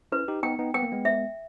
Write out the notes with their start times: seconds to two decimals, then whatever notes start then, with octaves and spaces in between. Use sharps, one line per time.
0.12 C#4 E4 B4
0.28 D#4 G4
0.43 B3 D#4 G5
0.59 B3 D#4
0.74 B3 G5
0.83 A#3
0.92 G#3 B3
1.05 E5